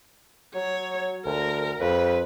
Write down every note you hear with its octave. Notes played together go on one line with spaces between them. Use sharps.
F#3 C#5
D2 A#4
F2 B4